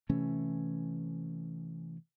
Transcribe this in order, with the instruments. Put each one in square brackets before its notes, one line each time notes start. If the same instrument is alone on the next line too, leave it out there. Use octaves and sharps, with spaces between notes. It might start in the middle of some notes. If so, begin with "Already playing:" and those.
[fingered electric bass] C3 E3 A3 C#4